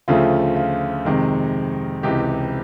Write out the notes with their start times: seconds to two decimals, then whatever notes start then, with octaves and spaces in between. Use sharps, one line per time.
0.08 D2 C#3 F3 A3 F4
0.56 F4
1.05 F2 C3 D#3 G#3
2.03 C#2 C3 E3 G4